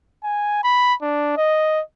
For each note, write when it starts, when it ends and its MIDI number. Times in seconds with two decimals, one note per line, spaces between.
0.24 0.59 80
0.64 0.94 83
1.02 1.37 62
1.37 1.81 75